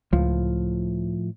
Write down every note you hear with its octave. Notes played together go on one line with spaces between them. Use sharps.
C#2 A2 F3